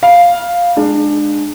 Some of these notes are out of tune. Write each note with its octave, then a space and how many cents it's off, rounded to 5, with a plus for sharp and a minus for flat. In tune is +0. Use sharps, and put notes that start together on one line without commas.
F5 +0 B5 -25
G#3 +10 D4 +25